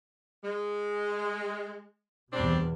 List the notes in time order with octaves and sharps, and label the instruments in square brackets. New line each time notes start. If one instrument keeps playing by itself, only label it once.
[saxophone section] G#3
[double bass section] E2 B2 [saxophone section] G3 C4 D4